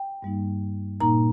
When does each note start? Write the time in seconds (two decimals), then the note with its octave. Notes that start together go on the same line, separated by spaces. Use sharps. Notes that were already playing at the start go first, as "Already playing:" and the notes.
Already playing: G5
0.22 G2 G3 A#3 D#4
1.01 A#2 A#3 D#4 A#5